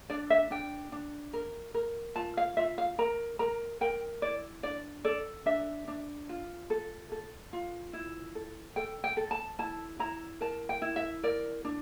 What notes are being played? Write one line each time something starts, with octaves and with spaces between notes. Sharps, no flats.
D4 D5
E5
D4 G5
D4
A#4
A#4
F4 A5
F5
F4 E5
F5
A#4 A#5
A#4 A#5
A#4 G5
E4 D5
D4 D5
A4 D5
D4 E5
D4
F4
A4
A4
F4
E4
A4
A4 G5
G5
A4
A5
E4 A5
E4 A#5
A#4 A5
G5
E4
E5
A#4 D5
D4